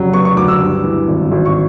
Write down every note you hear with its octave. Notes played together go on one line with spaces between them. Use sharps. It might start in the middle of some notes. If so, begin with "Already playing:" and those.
Already playing: F1 C#3 F#3
B3 C#6
C#6
D2 D6
E6
G2
E3
G#1
G#1
C#6